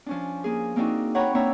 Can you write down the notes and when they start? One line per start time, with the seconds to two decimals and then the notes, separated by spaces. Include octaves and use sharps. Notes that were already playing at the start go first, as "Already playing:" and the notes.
0.06 F3 C#4 D4
0.44 A#3 G#4
0.76 A#3 C4 D4 D#4 F#4
1.15 C#5 F#5 G5 A#5 B5 C#6
1.35 A#3 C4 D4 C#5 E5 A#5